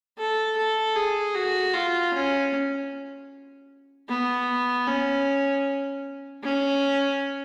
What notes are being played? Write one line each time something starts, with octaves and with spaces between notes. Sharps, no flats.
A4
A4
G#4
F#4
F4
C#4
B3
C#4
C#4